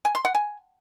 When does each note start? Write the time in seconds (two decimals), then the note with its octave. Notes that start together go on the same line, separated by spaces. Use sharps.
0.05 G#5
0.15 C6
0.25 F#5
0.35 G#5